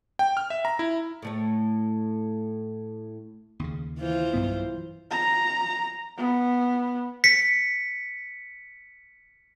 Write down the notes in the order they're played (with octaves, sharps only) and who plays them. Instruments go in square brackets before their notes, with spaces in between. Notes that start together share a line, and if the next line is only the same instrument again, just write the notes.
[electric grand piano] G5
F6
E5
A#5
E4
[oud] A2 A3 C#5
[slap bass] D#2 C#3
[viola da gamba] E3 F4 C5
[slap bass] B1 G2 B3
[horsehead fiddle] A#5
B3
[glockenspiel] B6 C#7